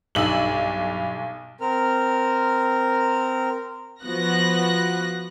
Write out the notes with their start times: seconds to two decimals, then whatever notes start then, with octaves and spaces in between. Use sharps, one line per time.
0.15 B1 G2 E6 F#7
1.61 C4 A#4 F6
4.05 F3 B3 F#4 F#6 A#6